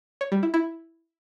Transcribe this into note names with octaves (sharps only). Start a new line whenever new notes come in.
C#5
G3
E4
E4